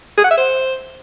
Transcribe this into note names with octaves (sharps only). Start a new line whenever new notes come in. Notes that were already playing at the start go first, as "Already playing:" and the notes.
G#4
F#5
E5
C5